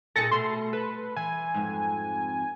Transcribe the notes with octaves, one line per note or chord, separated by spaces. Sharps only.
A#2 D#4 G#4 A4 A6 A#6 C#7
B2 A3 C6
A4 B4
E3 G#5
F2 G#2